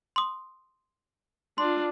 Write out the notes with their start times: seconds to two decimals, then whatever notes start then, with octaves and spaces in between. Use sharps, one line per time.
0.16 C6 D#6
1.58 D4 F4 C6